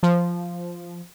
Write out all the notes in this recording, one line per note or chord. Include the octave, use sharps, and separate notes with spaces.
F3